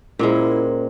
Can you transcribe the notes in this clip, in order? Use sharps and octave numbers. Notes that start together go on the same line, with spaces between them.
A#2 G#3 C#4 E4 A#4 C5